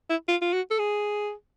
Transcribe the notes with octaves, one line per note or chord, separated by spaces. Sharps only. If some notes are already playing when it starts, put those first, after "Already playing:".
E4
F4
F4
F#4
A4
G#4